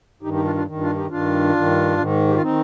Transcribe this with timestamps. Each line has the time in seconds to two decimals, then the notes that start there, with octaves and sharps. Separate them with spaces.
0.22 G2 D#3 D#4 G4
0.33 D#4 G4
0.44 D4 F4
0.55 D4 F4
0.66 D#3
0.71 G2
0.81 D4 F4
0.96 D#4 G4
1.10 G2 D#3 D4 F4
1.55 G2 D#3
1.98 G#2 D#3
2.28 G4
2.35 F4
2.42 D#3 C4 D#4